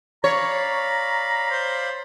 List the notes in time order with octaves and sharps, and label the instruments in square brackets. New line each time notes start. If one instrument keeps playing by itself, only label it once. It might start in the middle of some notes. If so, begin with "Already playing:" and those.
[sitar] C#5 [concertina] D5 F5 B5 [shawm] A#5
[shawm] C5